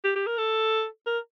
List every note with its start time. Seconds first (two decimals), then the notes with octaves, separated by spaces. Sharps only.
0.04 G4
0.16 G4
0.27 A#4
0.38 A4
1.07 A#4